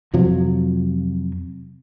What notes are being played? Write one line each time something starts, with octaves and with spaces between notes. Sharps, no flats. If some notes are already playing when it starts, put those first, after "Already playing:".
F2 C3 F3 F#3